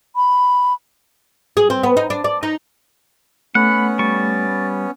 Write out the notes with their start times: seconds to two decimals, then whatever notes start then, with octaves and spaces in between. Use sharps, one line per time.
0.16 B5
1.57 G#4
1.70 C4
1.83 B3
1.97 D#4
2.10 D4
2.24 D5
2.43 D#4
3.55 A3 B3 C#4 F#5 B5
3.99 G3 C#6 A6